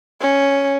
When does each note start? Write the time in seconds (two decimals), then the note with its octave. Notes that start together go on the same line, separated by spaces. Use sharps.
0.22 C#4